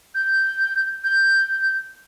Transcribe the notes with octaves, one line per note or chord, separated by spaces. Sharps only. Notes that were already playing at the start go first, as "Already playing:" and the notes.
G6
G6